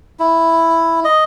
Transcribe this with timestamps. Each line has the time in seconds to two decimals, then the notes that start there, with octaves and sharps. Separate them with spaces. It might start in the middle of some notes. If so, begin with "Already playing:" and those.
0.20 E4
1.05 D#5